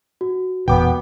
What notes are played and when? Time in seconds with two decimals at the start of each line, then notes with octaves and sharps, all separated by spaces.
0.21 F#4
0.68 E1 A#2 B3 G5 D6